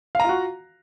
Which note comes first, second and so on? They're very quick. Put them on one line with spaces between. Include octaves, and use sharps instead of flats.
F5 A#5 F4 F#4